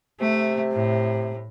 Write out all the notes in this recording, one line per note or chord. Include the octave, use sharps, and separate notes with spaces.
C3 A3
A2